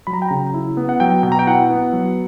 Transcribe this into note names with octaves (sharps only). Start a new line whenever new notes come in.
F#3 B5
A#5
G5
C#3 A#5
E4
B3
F#5
F#3 G5
B2 G5
A#5
G5
E4 F#5
B3
F#3